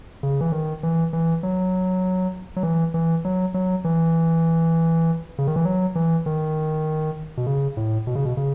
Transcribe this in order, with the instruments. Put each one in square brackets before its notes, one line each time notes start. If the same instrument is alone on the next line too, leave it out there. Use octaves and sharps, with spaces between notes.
[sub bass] C#3
E3
D#3
E3
E3
F#3
F#3
E3
E3
F#3
F#3
E3
C#3
D#3
E3
F#3
E3
D#3
B2
C#3
A2
B2
C#3
B2
C#3